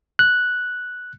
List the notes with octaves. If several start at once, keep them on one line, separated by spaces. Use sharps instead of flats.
F#6